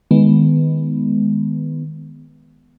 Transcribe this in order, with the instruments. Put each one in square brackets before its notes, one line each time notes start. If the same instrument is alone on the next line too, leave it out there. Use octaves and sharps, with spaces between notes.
[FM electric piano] D#3 G#3 B3